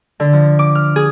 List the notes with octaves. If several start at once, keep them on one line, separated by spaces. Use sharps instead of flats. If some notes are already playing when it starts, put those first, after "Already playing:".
D3
F3
D6
F6
G#4